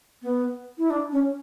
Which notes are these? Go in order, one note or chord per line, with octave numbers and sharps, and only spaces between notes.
B3
E4
D4
C#4